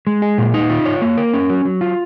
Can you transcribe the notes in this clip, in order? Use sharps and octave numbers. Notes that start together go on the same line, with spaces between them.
G#3
G#4
A#2
D#4
F4
C#5
A#3
A#4
C#4
F#3
F#3
F4